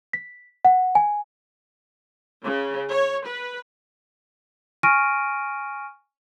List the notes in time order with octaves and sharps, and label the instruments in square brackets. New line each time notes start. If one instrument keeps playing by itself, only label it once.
[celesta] B6
F#5
G#5
[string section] C#3
C#5
B4
[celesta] G#5 C#6 F6 A#6 D7 D#7